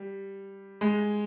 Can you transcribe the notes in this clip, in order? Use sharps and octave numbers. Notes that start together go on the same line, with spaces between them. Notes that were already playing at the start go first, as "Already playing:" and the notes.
Already playing: G3
G#3